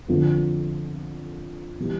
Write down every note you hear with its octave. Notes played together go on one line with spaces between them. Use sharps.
F2 D3 F3
E3 G3